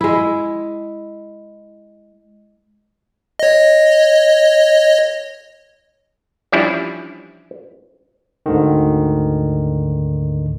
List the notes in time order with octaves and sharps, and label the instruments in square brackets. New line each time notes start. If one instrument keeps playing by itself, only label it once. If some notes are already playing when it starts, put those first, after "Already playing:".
[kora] G#3 E4
[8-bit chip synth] C#5 D#5
[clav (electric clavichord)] E3 F3 G3 C#4 D4 E4
[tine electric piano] D2 G#2 D3 D#3